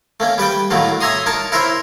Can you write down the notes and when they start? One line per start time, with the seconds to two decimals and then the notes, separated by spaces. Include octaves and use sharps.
0.20 A3 A#3 C#4
0.38 G3 B4 D5 G5
0.70 A2 D#3 F#3 A3 A#3
1.01 C#5 E5 G#5 A#5 C6 D#6
1.26 D#4 A#4 C#5 A5
1.52 E4 A#4 C5 C#5 E5